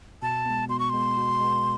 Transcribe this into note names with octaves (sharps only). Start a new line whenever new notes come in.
B2 A5
G#3 B3
B2 C6
C#6
G#3 B3 C6
B2
G#3 B3